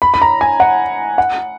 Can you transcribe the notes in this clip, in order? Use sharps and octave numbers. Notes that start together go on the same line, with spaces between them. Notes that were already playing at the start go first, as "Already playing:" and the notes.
B5
B5
A#5
G#5
F#5
F#5